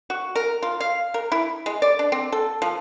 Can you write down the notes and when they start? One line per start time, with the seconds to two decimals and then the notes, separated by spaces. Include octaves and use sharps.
0.10 F#4
0.36 A#4
0.63 F4
0.81 F5
1.14 A#4
1.32 E4
1.66 G#3
1.82 D5
1.99 D4
2.12 C4
2.32 A4
2.62 F3